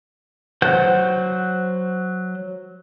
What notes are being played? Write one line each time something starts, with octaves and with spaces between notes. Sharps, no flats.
F#3 C5 F#5 G6